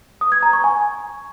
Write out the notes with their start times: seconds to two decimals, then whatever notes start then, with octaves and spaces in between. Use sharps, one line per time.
0.21 D#6
0.32 G#6
0.43 A#5
0.53 C#6
0.64 G#5